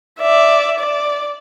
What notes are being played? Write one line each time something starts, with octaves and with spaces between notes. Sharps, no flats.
D5 E5
D5